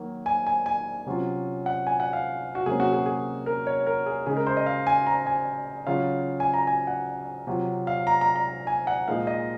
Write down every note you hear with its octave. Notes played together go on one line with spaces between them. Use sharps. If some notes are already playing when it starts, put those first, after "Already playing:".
Already playing: D#3 F#3 A#3
G#5
G#5
G#5
C3 F#3 C#4 F4
F#5
G#5
F#5
F5
F#4
C3 F#3 A#3 C#4 G#4
F#4
G#4
G#4
A#4
C#5
A#4
G#4
C#3 G#3 D#4 G#4
A#4
C5
D#5
F5
G#5
A#5
G#5
C#3 F#3 C#4 F4 F5
G#5
A#5
G#5
F#5
C3 F#3 C4 F4
F5
A#5
A#5
A#5
G#5
F#5
A#2 F3 G#3 D#4 F5
D#5